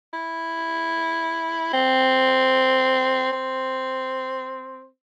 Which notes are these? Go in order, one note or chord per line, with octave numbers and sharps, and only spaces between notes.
E4
C4
C4